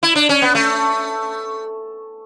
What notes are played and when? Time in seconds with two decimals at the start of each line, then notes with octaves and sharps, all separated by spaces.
0.03 E4
0.15 D4
0.29 C#4
0.42 B3
0.55 A3